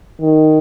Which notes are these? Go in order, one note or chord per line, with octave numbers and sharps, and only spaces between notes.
D#3